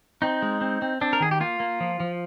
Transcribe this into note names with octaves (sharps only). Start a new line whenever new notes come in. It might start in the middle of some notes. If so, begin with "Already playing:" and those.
C4 D#4
G#3
C4
C4
C4 D4
A#4
D#3 G#4
G4
A#3 F4
A#3
F3
F3